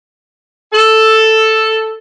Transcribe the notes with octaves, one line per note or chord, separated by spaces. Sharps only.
A4